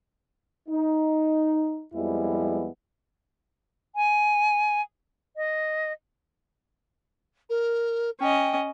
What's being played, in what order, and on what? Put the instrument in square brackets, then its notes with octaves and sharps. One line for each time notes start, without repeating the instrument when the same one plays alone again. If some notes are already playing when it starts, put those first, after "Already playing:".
[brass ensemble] D#4
F2 F3 G3 G#3 B3 E4
[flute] G#5
D#5
[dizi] A#4
[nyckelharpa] C#4 D#5 [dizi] G5